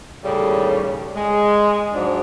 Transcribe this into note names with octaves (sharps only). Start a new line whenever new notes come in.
D#2 A2 C#3 G3
G#3
G#2 F3 F#3 D4